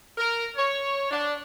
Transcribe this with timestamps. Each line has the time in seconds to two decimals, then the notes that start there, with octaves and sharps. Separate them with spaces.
0.17 A#4
0.56 C#5
1.10 D4